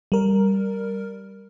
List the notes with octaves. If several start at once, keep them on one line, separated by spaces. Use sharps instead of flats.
G3 A#4